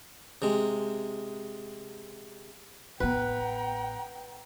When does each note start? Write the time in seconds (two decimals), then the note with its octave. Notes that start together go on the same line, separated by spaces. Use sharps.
0.42 C3 G#3
3.00 A1 B3 B4 F#5 G5 A#5